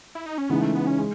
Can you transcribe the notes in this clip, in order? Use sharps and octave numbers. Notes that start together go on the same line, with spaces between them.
E4
D#4
C#4
C#3 E3 G#3 B3 D#4
A3
B3
C#4
G#3